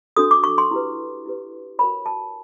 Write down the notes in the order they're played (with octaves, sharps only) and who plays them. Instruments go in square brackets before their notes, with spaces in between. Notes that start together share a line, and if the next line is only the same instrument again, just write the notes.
[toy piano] D4 F#4 A4 D#6
D6
C#6
C6
E4 G4 B4
E4 G4 B4
F#4 A#4 C#5 B5
A5